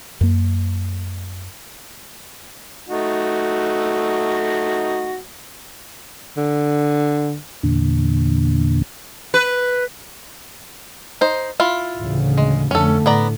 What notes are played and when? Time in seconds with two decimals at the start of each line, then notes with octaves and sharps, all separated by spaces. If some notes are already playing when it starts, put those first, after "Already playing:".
0.21 F#2 A#3
2.88 A3 D#4 F#4
6.37 D3
7.63 E2 A#2 D3
9.34 B4
11.21 D#4 C5
11.60 E4 F4
11.99 A1 D2 C#3
12.38 G#3
12.71 F2 D3 A3 C#4 A4
13.06 A2 B3 D5 A#5